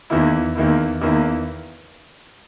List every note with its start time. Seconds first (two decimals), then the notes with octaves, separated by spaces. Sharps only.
0.10 E2 D#3 A#3 E4
0.56 E2 D#3 A#3 E4
1.01 E2 D#3 A#3 E4